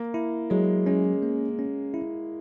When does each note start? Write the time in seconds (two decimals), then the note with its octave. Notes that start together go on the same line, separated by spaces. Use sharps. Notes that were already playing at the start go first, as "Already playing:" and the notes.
Already playing: A#3
0.14 E4
0.50 F#3 G#3
0.86 G#3 C#4
1.23 A#3
1.59 C#4
1.94 E4